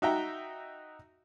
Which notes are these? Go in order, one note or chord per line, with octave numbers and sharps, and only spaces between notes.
D#4 F#4 E5 G5 A#5